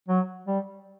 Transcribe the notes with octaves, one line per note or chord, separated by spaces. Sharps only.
F#3
G3